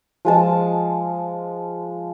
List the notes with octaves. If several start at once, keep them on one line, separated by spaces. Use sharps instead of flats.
F3 G#3 A5